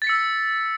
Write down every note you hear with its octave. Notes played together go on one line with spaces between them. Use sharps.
E6 A6 B6 C#7